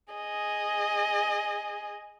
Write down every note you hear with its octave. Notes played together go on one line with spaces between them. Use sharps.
G#4 D#5